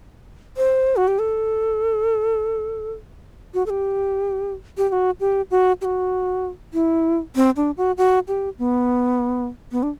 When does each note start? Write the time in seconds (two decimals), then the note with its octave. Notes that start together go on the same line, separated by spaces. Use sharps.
0.57 C5
0.97 F#4
1.08 G4
1.19 A4
3.54 F#4
3.66 A4
3.70 G4
4.78 G4
4.89 G4
4.92 F#4
5.20 G4
5.51 F#4
5.81 G4
5.85 F#4
6.74 E4
7.36 C4
7.56 D4
7.77 F#4
7.98 F#4
8.28 G4
8.59 B3
9.72 B3
9.83 D4